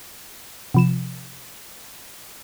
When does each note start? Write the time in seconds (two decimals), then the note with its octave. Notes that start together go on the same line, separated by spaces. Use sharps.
0.74 C3 F3 E7